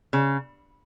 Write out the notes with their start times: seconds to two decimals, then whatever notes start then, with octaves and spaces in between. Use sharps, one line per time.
0.13 C#3